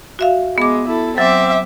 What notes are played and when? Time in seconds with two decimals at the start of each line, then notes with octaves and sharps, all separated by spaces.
0.19 F#4 E5 F5
0.58 G#3 B3 D6
0.88 E4 A4
1.18 F#3 C4 E5 D6